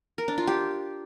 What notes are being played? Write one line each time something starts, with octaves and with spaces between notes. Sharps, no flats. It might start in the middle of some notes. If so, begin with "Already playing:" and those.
A#4
D4
F4
G4